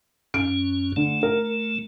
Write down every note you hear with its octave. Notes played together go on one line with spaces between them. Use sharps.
F#2 C#4 D7
D3 A3
A#4